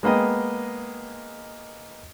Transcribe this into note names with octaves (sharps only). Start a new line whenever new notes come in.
G#3 A#3 B3 D#5 G5